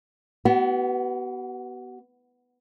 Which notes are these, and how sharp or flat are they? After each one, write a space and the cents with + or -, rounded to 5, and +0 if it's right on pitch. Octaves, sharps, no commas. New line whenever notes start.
B3 +0 F#4 +45